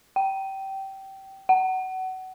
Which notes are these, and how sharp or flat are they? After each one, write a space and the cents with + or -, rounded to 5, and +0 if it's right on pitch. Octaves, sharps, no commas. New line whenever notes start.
G5 -20
F#5 +25